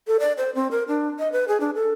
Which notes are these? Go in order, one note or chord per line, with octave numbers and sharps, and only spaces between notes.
A4
D5
C5
C4
A#4
D4
D#5
B4
G#4
D4
A4